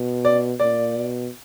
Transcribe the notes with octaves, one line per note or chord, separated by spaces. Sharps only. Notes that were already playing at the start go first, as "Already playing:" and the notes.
Already playing: B2
D5
A#2 D5
B2